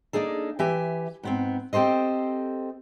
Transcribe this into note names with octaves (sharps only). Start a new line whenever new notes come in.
A#3 D4 D#4 G#4 A4
E3 G4 E5 G#5
G#2 B3 C4
C4 G4 A4 C5 D#5